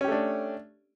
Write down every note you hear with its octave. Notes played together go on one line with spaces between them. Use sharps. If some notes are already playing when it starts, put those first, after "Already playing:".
A3 C#4 D4 G4